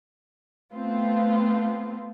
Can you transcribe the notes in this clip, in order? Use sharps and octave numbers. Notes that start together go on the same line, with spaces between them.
A3 B3 C4 F4